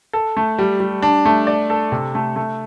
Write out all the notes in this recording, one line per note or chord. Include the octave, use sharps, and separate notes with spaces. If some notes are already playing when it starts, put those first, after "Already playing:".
A4
A3
G3
G3
D4
A3
D5
A4
C3
A3
A3